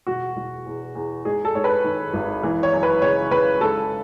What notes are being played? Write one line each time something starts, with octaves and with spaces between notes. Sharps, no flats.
E1 F#4
E1
E2
E2
G#2 G#4
A4
G#2 C#5
B4
D#3
G#1
E3
C#5
F#2
B4
C#3 C#5
C#3 B4
G#2 A4